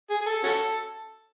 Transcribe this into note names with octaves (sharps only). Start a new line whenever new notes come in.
G#4
G#4
A4
C#4 F#4 A4